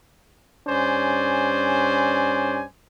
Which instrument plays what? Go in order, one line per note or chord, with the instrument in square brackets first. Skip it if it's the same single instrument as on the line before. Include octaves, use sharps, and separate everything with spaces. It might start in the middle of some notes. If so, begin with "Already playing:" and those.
[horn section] G2 C#4 C5 D5 G#5